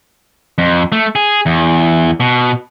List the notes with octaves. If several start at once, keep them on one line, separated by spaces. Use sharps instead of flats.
F2
A3
G#4
E2
B2